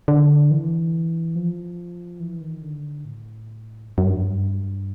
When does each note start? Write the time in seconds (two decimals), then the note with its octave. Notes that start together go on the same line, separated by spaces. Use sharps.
0.08 D3
0.51 E3
1.35 F3
2.20 E3
2.41 D#3
2.62 D3
3.05 A2
3.89 G2
3.98 F#2
4.06 G2